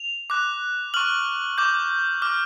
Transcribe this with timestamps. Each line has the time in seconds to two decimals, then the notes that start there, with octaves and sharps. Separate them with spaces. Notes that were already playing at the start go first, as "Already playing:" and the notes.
Already playing: F7
0.30 D6 F#6
0.94 C#6 F6 F#7
1.58 D6 G6
2.22 D6 F6